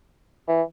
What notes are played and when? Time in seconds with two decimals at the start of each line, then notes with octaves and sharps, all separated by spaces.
0.48 E3